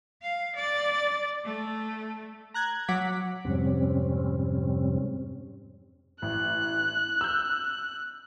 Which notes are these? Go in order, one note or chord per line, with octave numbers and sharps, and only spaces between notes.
F5
D5
A3
A#5 F#6 G#6
F#3 F#5 D6 B6
F2 G#2 C3 G3 C4 C#4
A1 F#6
E6 G6